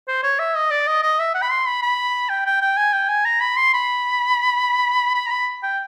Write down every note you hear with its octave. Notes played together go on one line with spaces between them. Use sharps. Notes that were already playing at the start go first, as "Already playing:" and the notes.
C5
C#5
E5
D#5
D5
D#5
D#5
E5
F#5
B5
C6
B5
B5
G5
G5
G5
G#5
G5
G#5
A#5
B5
C6
B5
B5
A#5
B5
G5